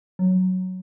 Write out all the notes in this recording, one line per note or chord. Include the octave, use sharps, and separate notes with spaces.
F#3